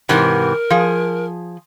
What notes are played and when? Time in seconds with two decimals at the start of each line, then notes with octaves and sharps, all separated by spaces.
0.09 G#2 C3 E3 A#4
0.70 F3 G#4